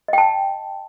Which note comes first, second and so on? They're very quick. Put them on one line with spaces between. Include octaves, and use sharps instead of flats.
D#5 G5 A5